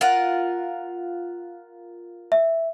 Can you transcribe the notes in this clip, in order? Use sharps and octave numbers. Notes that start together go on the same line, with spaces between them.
F4 A#4 F#5
E5